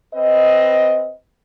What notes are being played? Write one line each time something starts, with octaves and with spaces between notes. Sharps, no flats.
C4 B4 D#5